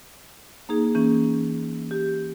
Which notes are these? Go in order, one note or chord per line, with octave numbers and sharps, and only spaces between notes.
A#3 D#4 G#4
E3 A#3 C#4
G4